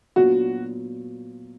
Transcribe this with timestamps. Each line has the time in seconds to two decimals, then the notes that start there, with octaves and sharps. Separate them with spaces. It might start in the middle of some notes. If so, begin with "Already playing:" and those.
0.16 A#2 F#3 B3 D4 F4 F#4